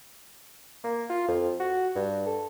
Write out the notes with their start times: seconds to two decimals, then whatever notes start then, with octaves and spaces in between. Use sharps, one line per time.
0.84 A#3
1.10 F4
1.28 F2
1.60 F#4
1.95 G2
2.27 A4